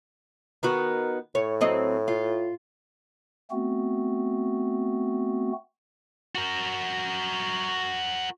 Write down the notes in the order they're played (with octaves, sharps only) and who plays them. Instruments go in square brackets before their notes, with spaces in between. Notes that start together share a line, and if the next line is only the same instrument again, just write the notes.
[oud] D#3 B3 F#4 [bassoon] A#4
[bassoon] A2 [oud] C#5
[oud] F#3 C4 D#5
F4
[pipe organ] A3 B3 C4 F#4
[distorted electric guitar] F#4 A#4